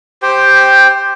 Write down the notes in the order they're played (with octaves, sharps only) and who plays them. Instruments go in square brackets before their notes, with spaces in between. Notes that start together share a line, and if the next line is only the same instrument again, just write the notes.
[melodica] G4 C5 G5